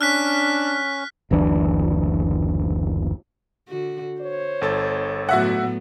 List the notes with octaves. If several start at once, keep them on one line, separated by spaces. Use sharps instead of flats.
C#4 D4 F6 F#6 B6
F#1 D2 E3 D4
D3 F#4
C5 C#5
G1 A4 A6
A2 F#3 B3 F#4 E5 F#5